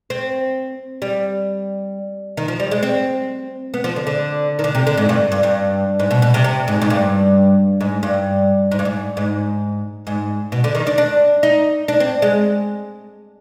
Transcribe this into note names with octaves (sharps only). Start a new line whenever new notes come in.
C4
G3
D#3
F3
G3
G#3
C4
B3
F3
D3
D3
D#3
D3
C3
D3
G#2
G2
G2
G2
G#2
B2
B2
C3
C3
G#2
G#2
G2
G#2
G2
G#2
G2
G#2
G#2
G#2
B2
D3
D#3
D4
D4
D#4
D4
C4
G#3